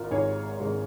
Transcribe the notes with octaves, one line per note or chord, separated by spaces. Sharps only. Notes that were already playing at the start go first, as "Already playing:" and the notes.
Already playing: G#1 G#2 F4 A#4
G#1 G#2 G#3 G#4 C#5
G#1 G#2 G#3